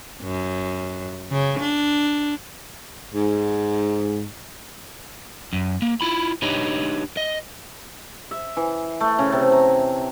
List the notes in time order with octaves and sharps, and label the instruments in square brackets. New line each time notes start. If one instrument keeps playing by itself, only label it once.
[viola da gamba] F#2
C#3
D4
[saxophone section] G#2
[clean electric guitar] F#2
A#3
E4 F4 B5
D4 D#4 G4 B4 C#5 D#5
D#5
[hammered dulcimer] E5
E3
A3
C#3
C3
A#5